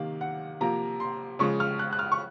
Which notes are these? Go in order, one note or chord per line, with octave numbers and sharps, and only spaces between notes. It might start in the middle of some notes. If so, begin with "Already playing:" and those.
Already playing: C3 D#3 A#3 F5
F#5
C3 F3 A#3 A#5
C6
C#3 F3 G#3 C#6
F6
F#6
F#6
F6
C#6